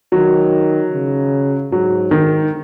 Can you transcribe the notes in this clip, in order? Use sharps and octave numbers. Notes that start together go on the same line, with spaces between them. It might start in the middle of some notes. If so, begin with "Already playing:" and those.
D#3 F#3
C#3
G#2 F#3
D#3